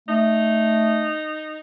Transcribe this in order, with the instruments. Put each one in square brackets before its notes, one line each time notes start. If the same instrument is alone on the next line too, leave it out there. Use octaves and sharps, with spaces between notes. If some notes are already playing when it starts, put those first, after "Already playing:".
[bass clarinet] A3 [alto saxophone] D#4